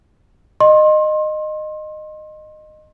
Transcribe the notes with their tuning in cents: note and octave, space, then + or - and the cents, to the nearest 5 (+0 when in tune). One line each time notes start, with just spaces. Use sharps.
D#5 -20 C6 +30